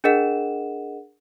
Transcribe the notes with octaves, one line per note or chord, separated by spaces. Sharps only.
D4 G#4 A#4 D#5 F#5 E7